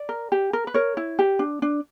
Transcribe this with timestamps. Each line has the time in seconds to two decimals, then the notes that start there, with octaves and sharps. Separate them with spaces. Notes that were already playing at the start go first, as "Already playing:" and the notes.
Already playing: D5
0.09 A#4
0.32 G4
0.53 A#4
0.67 B4
0.74 A#4 C#5
0.97 E4
1.19 G4
1.39 D4
1.62 D4